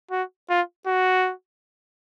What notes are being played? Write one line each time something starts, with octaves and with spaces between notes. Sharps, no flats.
F#4
F4
F#4